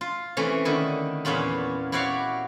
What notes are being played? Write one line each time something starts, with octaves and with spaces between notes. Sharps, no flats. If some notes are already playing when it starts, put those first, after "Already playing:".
F4
C3 E3 A3 C#4
D3 D#3 E4
E2 A#2 C#4 F4 B5
E4 F#4 G4 C#5 D5 F5